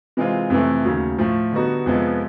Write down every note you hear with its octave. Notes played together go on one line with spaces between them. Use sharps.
C3 E3 G#3 C4 F4
F2 C3 E3 A3
D#2 C#3 F#3 A3
A2 F3 A3
D3 G3 B3 D#4 F#4
F2 C3 F3 G#3 B3